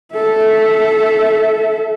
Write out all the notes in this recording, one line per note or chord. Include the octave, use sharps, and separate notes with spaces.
A4 E5